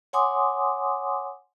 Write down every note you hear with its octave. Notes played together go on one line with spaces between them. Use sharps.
C#5 F#5 G#5 C6 D6 D#6